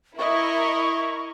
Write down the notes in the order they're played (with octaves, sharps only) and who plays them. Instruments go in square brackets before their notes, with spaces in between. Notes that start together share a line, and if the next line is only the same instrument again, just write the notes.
[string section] E4 A#4 [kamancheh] D#5 [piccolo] C#6